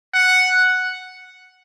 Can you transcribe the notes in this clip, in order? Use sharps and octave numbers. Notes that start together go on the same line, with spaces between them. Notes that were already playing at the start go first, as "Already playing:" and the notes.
F#5